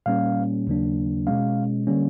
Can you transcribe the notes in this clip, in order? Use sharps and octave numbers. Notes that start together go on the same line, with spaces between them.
A#2 G3 A#3 C#4 F5
D#2 C#3 F#3 A#3 D4
B2 G#3 C#4 F5
D3 G3 A#3 C#4